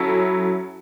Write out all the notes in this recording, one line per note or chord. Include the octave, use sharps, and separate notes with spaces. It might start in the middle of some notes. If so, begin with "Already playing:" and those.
Already playing: F#3 C#4 E4 A4